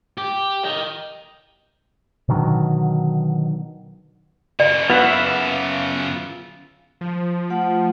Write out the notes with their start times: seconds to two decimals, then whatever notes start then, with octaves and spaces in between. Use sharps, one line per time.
0.18 G4
0.64 D#5 G5
2.28 B2 D3 D#3 F#3
4.60 F#2 C#3 D5
4.90 B3 F4 E5 F#5
7.01 F3
7.50 A3 F4 F#5